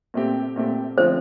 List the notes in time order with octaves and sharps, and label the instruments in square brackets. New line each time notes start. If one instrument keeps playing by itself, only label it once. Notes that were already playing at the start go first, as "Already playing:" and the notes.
[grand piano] A#2 A3 C4 G4
A#2 A3 C4 G4
[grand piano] D3 F3 A3 C4 [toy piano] C5